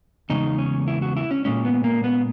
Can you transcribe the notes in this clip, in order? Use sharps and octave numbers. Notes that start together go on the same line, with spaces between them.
E2 C#3 G#3 D#4
C#4
E4
F#4
E4
C#4
A#2 G#3 C#4
B3
A#3
B3